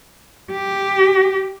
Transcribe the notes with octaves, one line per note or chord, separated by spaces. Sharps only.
G4